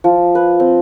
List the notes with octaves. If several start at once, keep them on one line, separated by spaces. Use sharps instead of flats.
F3
B4
C4